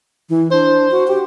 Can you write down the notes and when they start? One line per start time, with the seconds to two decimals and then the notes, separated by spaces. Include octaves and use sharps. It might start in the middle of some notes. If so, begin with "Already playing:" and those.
0.30 E3
0.51 D4 C5
0.91 F#4
1.08 G4